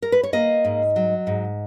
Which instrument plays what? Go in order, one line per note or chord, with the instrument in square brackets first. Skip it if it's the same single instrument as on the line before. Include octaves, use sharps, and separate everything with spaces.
[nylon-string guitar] A#4
B4
C#5
A#3 D#5
G#2
F#3
G#2